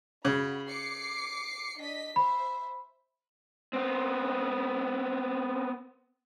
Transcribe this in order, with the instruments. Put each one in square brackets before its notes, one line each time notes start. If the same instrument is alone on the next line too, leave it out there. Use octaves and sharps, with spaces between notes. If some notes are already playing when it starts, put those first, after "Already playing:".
[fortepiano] C#3 [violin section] F#4 B5
[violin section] D6 C7 C#7
D4 D#5 B6
[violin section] C5 E5 [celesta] B5
[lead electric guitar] B3 C4